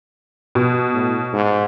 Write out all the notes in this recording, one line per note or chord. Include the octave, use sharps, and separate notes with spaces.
B2
A2
G#2